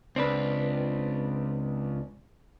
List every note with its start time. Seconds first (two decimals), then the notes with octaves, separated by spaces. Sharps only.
0.16 C#2 C4 D4 B4